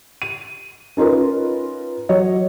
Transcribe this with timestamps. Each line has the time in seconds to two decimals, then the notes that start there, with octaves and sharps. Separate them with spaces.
0.22 D#7
0.97 C#4 D#4 F4 A#4 B4
2.09 F#3 C#5 D#5